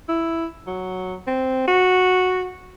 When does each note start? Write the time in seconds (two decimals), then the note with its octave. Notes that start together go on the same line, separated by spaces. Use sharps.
0.08 E4
0.67 F#3
1.27 C4
1.67 F#4